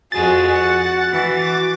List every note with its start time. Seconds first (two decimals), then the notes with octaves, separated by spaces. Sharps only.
0.12 F2 G#3 F#4 G#4 A6
0.53 F#5
1.13 E3 F#4
1.42 D6